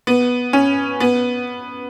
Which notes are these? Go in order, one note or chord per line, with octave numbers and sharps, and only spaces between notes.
B3
C#4
B3